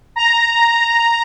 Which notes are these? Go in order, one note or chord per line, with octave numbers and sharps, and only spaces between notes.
A#5